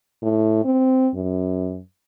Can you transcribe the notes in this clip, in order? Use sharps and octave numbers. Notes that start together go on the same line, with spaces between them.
A2
C4
F#2